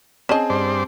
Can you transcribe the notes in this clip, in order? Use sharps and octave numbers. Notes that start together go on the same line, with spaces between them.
C4 C#4 G#4 D#5 A5
G2 C5 D5